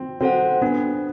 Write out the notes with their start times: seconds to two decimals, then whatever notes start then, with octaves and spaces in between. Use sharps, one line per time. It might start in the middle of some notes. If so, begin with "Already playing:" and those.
Already playing: C4
0.21 C4 F#4 A4 C5 F#5
0.62 B3 D4